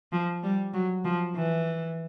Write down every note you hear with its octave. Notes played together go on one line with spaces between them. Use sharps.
F3
G3
F#3
F3
E3